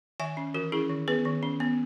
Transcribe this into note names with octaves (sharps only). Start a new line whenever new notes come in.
D#3 E5 G#5
C#4
E3 F#4 A#4
C#4 E4 G#4
D#3
B3 G#4 B4
D#3
C#4
B3